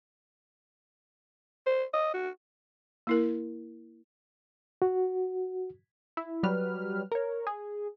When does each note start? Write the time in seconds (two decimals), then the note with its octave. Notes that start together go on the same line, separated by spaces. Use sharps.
1.67 C5
1.94 D#5
2.14 F#4
3.07 A#3 E4 A#4
4.82 F#4
6.17 E4
6.43 F#3 G3 B4 F6
7.12 A#4 C#5
7.47 G#4